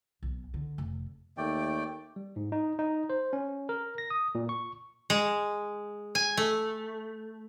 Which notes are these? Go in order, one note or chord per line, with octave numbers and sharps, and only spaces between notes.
B1
D3
F1
D#2 A3 D5 G5
G3
G#2
D#4
D#4
C5
C#4
A#4
A#6
D#6
A#2
C#6
G#3
G#5
A3